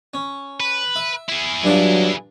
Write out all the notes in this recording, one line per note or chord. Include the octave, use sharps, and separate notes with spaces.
C#4
B4
E5
E4 G#4
G2 F#3 D4 F4